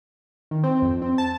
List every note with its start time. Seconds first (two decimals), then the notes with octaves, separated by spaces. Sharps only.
0.51 D#3
0.63 C4
0.82 F2
1.02 C4
1.18 A5